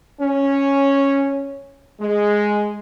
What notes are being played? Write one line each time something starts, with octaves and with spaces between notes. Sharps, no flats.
C#4
G#3